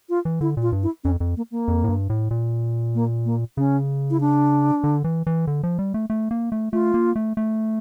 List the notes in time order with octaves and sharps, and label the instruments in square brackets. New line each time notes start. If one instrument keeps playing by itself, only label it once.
[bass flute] F4
[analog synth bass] E3
[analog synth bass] D3 [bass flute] E4
[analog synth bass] A#2
[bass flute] F4
[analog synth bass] G2
[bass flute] E4
[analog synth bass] F2 [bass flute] C#4
[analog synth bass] F2
[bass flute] A#3
A#3
[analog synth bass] F2
A2
G2
A2
A#2
[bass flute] A#3
A#3
[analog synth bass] C#3 [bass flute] C#4
[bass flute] E4
D4
[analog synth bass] D3
E3
E3
D3
F3
G3
A3
A3
A#3
A3
[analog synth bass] A3 [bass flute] F4
[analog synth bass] A#3
A3
A3